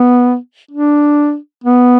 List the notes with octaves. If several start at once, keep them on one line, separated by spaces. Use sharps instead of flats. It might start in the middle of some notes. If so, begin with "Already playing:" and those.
Already playing: B3
D4
B3